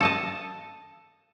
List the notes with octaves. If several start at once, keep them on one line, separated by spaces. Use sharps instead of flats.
A4 D#5 A5